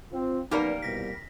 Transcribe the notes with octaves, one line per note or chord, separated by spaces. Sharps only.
C4 F4
F#2 G3 A#3 B3 D#4 A#4 D5
C2 B2 A#6 B6